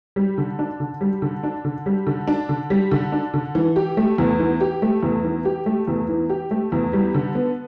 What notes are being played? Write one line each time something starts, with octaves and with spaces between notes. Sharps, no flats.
G3
D3
D4
D3
G3
D3
D4
D3
G3
D3
D4
D3
G3
D3
D4
D3
E3
G4
A3
E2
E3
G4
A3
E2
E3
G4
A3
E2
E3
G4
A3
E2
G3
D3
B3